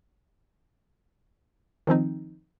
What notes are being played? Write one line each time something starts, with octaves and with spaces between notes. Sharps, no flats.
D#3 F3 C4 D#4